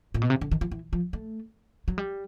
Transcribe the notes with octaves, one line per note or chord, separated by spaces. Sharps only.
A#2
B2
C3
D3
D#3
F3
E3
F3
A3
F#3
G3